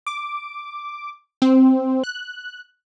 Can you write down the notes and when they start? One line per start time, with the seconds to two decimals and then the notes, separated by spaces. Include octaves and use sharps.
0.06 D6
1.42 C4
2.04 F#6